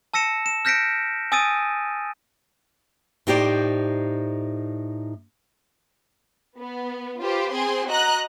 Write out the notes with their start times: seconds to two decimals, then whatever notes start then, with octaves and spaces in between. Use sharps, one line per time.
0.14 A5 E6 A#6 C#7 E7
0.46 E7
0.65 F6 G6 A#6 B6 C#7 D7
1.32 G#5 D#6 E6 A6 D7 D#7
3.27 A2 D#4 G4 C5 D5
6.59 B3
7.23 F4 G4 B4 C5
7.53 C4 G#4 C6
7.88 F#4 D#5 A#5 F#6